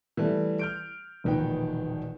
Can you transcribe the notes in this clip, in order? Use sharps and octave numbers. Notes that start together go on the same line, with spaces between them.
E3 G3 A3
F6 G6 D7
E1 A#1 D#3 B4 G5